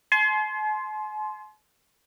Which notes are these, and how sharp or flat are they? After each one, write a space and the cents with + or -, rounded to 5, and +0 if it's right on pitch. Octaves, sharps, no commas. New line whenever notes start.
G#5 +45 C6 +0